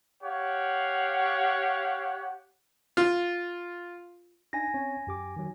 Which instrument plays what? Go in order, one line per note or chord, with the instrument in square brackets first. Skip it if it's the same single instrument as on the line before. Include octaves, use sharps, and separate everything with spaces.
[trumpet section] G4 C#5 F5 F#5
[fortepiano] F4
[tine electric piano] D4 D#4 [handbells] G#5 A#6
[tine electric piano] C4 C#4 C#5
F#2 G4 D6
D#3 F#3